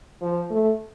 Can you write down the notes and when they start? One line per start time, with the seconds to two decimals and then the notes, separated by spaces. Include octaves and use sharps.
0.22 F3
0.50 A3